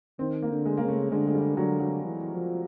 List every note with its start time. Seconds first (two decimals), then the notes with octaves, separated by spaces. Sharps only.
0.19 D#3 C4
0.42 A#3
0.50 D3
0.65 G#3
0.77 C#3 A#3
0.88 A3
1.11 D3 G#3
1.27 G#3
1.35 G3
1.57 D3 F#3
1.80 F#3
2.04 E3
2.34 F3